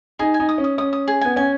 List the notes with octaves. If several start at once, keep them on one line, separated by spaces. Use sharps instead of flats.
D#4 G#4
G#5
D#4
D#6
C#4
D#6
C#4 D#6
D#6
G#4
B3 G#5
C#4 G#5